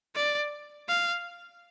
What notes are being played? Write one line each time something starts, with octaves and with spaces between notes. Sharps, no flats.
D5
F5